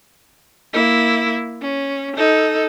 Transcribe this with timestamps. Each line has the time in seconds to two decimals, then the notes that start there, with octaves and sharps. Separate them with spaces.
0.73 A#3 E4
1.61 C#4
2.16 D#4 A4